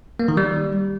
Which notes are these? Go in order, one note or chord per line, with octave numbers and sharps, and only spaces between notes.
A#3
D#3
G3